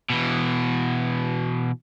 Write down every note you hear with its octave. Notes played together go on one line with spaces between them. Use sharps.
B2 E3